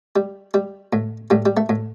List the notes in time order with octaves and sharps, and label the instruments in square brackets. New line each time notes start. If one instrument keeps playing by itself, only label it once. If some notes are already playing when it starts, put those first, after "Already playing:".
[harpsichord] G3
G3
A2
A2 G3
G3
A3
A2